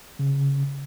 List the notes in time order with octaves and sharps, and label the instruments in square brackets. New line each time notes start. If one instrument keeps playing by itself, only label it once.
[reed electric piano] C#3